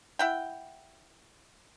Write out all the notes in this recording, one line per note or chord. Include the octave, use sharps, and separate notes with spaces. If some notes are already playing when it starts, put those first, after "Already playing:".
E4 F#5 G5